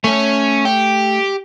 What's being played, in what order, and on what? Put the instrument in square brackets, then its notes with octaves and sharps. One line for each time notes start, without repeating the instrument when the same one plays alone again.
[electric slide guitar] A3 [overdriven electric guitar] C#4
[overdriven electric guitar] G4